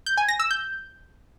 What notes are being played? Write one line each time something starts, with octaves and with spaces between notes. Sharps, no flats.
G6
G#5
A#6
E6
G6